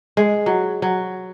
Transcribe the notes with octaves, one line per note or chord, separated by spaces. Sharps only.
G#3
F#3
F#3